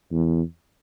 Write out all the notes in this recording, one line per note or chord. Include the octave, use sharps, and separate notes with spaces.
E2